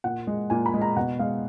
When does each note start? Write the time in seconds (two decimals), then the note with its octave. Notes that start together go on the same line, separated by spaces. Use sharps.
0.04 A#2 F#5
0.27 G#3
0.50 A#2 G#5
0.66 B5
0.74 G#3
0.81 A#5
0.96 B2 F#5
1.19 G#3 F5